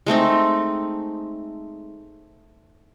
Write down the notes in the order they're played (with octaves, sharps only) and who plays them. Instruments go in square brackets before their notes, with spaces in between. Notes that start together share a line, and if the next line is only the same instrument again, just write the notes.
[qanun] G#3 A3 C4 D#4